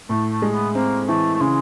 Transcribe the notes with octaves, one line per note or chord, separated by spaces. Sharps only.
A2 A3
A3
G#3
B3
A#3 C4
E3 A3
A3
C#3 G#3